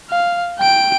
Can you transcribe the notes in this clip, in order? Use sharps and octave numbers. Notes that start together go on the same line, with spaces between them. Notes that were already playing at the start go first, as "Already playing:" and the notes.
F5
G5 D7